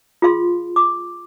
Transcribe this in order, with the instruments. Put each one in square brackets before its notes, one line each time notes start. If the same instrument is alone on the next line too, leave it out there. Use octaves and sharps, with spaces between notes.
[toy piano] F4 G#4 F5 C6
D6